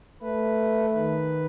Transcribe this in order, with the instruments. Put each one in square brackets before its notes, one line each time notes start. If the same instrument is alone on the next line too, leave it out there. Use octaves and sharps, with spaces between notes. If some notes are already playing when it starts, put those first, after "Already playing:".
[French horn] A3 [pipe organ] B4
[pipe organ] D#3 B4